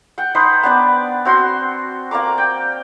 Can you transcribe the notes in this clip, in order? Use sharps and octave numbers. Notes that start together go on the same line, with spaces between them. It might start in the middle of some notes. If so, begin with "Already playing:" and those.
F#5 G5
D#4 B4 C5 D#6
B3 D4 D5
C4 F#4 C6
A#3 D5 A#5 D6
G5